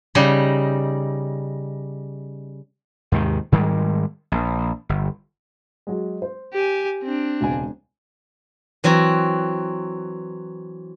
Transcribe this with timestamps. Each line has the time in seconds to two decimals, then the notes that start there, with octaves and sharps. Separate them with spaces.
0.15 C#3 G3 D#4
3.12 D#2 G#2 C3 D#3
3.52 G#2 D#3 G3 G#3
4.32 A#1
4.89 G1
5.87 F#3 G#3
6.22 C5
6.53 G4 G#5
7.03 C4 D4
7.41 E1 C#2 G#5
8.84 E3 F#3 C4 F#4